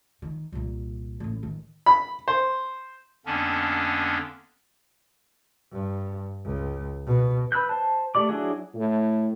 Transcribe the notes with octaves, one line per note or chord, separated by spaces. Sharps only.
D#3
C2 A#2
A1 A2
D#3
B5
C5
F2 D3 A#3 B3 C#4 D4
G2
C#2
B2
B4 B5 E6 F#6 G6
C5 A5
A3 F4 G4 D5 D6
F#3 D4 E4 F#4 G#4
A2